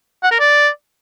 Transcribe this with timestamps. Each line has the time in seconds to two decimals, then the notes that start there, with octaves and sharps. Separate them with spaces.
0.23 F#5
0.31 A#4
0.39 D5